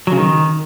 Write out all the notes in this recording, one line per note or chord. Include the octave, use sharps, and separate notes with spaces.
F#3
C#3
D#3